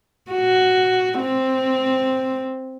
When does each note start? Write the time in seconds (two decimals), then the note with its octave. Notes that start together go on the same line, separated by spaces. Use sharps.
0.32 F#4
1.20 C4